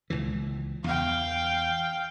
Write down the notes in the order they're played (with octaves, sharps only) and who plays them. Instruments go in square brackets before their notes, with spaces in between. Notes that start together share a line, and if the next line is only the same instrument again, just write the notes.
[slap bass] C#2 A#2 E3
[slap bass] E2 [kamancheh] F5 G5